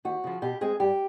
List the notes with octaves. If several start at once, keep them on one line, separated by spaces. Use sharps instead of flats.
D#2 F#4
C#3 F3
B2 G4
G#3 C4 G#4
G2 G4